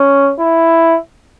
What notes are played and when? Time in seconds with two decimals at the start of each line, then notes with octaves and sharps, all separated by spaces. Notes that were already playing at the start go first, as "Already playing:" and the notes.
Already playing: C#4
0.39 E4